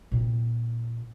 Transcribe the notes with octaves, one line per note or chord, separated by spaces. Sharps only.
A#2 C4